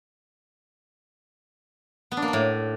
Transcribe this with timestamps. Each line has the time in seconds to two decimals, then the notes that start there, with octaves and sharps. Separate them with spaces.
2.12 B3
2.17 D4
2.22 A#3
2.28 D4
2.33 A2